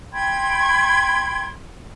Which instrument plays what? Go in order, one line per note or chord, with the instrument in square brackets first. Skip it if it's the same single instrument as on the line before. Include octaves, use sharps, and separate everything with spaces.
[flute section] G5 B5 C6 G#6